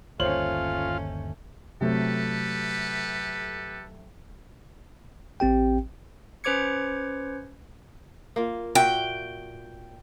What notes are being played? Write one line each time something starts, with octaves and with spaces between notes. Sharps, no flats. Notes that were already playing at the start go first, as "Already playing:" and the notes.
G1 D#2 A3 C#4 F4 C5 C#5 F#7
C3 F#3 A3 G4 A4 B4
A1 C4 G4 G5
C#4 B4 C5 D6 G#6 C#7
A#3 F4
A#2 F#4 E5 G5